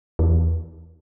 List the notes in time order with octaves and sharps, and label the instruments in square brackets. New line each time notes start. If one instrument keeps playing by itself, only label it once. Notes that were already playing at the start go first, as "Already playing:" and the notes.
[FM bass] E2